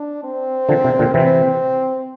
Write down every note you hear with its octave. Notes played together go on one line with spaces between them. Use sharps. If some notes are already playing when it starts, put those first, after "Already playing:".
Already playing: D4
C4
D3 F3
C3
A#2 D3
C3 E3 C4